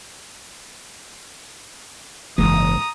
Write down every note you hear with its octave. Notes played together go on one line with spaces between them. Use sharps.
F#1 G#2 C#3 E3 A#3 D4 A#5 D#6